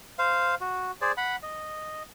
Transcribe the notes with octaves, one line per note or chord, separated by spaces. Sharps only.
C5 F5
F#4
G#4 C5 D5
F#5 B5
D#5